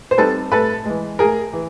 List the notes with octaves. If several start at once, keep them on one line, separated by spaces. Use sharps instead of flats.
C5
G3 C4 D#4 A4 B4
A2 A4 B4
E3 G#3
A2 G#4 A#4
E3